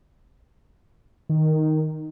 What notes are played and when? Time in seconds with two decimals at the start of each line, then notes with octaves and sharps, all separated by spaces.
1.29 D#3